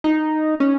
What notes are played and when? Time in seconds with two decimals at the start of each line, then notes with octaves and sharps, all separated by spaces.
0.04 D#4
0.60 C#4